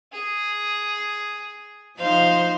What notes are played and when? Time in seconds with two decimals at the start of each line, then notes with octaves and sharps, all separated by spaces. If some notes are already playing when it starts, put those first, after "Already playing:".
0.12 G#4
1.98 F3 D#4 C5 F5